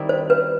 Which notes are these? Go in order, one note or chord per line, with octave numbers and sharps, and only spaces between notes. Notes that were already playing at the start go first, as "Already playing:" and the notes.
Already playing: D#3 G3 C4 E4
C5
B4